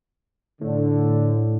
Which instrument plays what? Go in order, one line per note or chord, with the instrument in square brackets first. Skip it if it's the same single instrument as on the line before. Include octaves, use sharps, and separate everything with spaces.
[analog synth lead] A2 [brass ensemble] D3